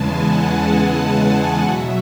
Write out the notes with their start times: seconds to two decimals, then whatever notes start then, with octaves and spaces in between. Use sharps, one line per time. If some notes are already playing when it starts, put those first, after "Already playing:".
Already playing: E2 C#3 E3 G#3 G#5 A5
0.13 F#5
1.61 B2 F#3 E5